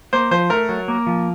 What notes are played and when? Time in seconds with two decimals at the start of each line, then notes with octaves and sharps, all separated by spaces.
0.13 A#3 C5
0.31 F3 C5
0.50 A3 A#4
0.69 F#3
0.88 A#3
1.07 F3